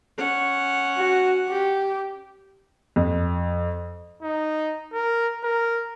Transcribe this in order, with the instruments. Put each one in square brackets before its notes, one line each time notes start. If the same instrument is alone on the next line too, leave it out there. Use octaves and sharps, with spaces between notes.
[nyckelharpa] C#4 F#5
[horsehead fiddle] F#4
G4
[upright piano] F2
[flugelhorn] D#4
A#4
A#4